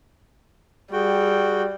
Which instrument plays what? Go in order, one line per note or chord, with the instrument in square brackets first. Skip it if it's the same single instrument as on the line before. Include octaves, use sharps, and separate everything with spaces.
[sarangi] G3 [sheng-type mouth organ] F#4 G5 [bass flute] G#4